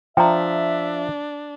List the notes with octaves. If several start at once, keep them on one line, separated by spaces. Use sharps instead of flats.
F3 D4 E5 G5 A#5